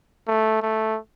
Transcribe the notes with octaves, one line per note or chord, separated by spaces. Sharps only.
A3
A3